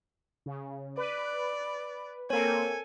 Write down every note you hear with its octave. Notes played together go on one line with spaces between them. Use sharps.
C#3
B4 D5
A#3 C4 A4 A#4 C#5 G#5